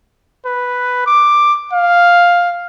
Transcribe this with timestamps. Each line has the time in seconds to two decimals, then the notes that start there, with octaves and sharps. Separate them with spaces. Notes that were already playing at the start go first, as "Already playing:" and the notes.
0.46 B4
1.07 D6
1.73 F5